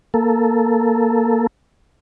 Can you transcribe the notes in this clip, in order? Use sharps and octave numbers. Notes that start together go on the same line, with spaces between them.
A#3 A4